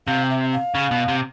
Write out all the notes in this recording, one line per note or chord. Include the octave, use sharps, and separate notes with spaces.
C3 F5
E5
F5
C#3
B2
C3